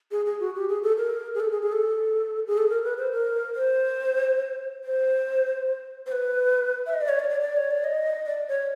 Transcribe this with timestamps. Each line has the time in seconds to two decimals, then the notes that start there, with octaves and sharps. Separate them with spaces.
0.11 G#4
0.26 G#4
0.40 F#4
0.55 G4
0.69 G#4
0.83 A4
0.97 A#4
1.35 G#4
1.40 A4
1.52 G#4
1.62 G#4
1.72 A4
2.47 G#4
2.58 A4
2.69 A#4
2.84 B4
2.98 C5
3.12 A#4
3.55 C5
4.84 C5
6.06 C5
6.12 B4
6.86 E5
6.94 D#5
7.01 D5
7.09 C#5
7.20 D5
7.30 D5
7.41 D5
7.57 C#5
7.71 D5
7.84 D#5
8.26 D5
8.48 C#5